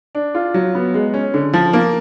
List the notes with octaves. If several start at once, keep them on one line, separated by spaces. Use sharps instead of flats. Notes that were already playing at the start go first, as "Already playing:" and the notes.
D4
F4
F#3
B3
G#3
C#4
D3
F3
A#3